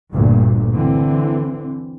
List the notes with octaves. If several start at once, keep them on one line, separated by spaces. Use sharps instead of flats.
G1 D2 G2 A#2 A#3
D3 E3 C4